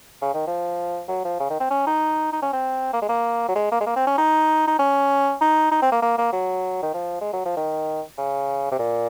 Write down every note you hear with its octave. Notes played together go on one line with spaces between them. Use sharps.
C#3
D#3
F3
F#3
F3
C#3
D#3
C4
C#4
D#4
D#4
C#4
C4
A#3
G#3
A#3
F#3
G#3
A#3
G#3
A#3
C4
C#4
D#4
D#4
C#4
D#4
D#4
C4
A#3
A#3
A#3
F#3
D#3
F3
G#3
F#3
F3
D#3
C#3
C3
A#2